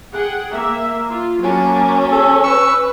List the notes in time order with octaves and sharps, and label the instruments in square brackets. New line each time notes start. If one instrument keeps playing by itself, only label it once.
[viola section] G#4 F#5 G5
A#3 E5
F4
[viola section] F#3 A#3 A5 [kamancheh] C#4
[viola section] G#4 [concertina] A4
[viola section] B4 [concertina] C#6 E6